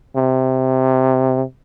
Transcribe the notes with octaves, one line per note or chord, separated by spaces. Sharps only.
C3